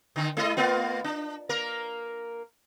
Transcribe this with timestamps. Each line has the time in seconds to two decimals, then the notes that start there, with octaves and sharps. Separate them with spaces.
0.16 D3 D#3
0.37 G#3 E4 D#5
0.57 A3 B3 F4
1.04 D4
1.49 A#3 A#4